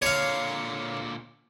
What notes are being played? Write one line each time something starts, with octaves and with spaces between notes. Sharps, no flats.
A#2 D3 C#5 F5